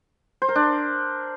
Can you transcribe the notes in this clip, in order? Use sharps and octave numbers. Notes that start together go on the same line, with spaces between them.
C5
A#4
D4